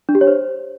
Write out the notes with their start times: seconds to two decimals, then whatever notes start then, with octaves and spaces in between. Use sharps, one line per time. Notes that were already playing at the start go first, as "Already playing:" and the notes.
0.09 D4
0.15 G4
0.21 C#5
0.27 C5